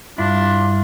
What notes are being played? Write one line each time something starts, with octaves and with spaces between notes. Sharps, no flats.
G2 D4 E4 F4